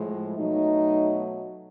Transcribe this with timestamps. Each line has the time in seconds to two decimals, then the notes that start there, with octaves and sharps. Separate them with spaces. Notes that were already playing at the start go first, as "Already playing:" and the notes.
Already playing: A2 F3 G#3
0.36 B2 F#3 A3 D#4